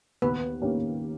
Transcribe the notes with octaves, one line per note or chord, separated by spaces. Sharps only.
D#2 B3 B4
D#3 A#3 C#4 G4